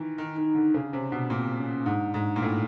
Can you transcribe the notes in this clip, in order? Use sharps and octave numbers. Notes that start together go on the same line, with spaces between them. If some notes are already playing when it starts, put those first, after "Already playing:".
Already playing: D#3 E3
D#3 D#4
D#3
D#4
D3
C#3 D4
C3 C#4
B2 D4
A#2 C4
C#4
G#2 D4
G#2
A#2
A2